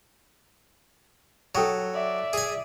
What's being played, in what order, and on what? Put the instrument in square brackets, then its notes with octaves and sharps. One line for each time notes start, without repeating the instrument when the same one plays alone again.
[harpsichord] F#3 [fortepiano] A4 G5 D#6
[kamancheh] D5 E5
[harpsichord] G#4 G#5